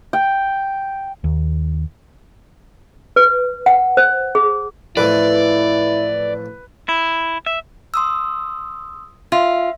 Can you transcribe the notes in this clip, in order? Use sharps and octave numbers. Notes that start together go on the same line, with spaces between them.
G5
D#2
B4
F#5
C5
G#4
F2 A2 E3 E4 B4 D5
E4
E5
C6 D#6 E6
F4 E5